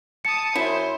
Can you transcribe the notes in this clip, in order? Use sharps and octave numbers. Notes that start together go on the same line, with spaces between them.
A5 D#6 C#7
F#2 E4 C5